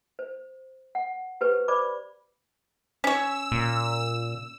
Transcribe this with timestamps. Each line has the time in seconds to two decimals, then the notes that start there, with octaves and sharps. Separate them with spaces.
0.19 C5
0.95 F#5
1.41 G4 B4 C5 C#6
1.68 C5 D5 B5 D6
3.04 C#4 C#5 E6
3.52 A#2